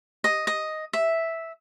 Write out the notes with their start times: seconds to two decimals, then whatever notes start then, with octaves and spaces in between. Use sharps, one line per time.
0.24 D#5
0.47 D#5
0.93 E5